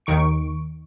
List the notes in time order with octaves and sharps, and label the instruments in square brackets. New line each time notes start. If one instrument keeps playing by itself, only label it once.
[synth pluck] D#2 D#3 C#6 D7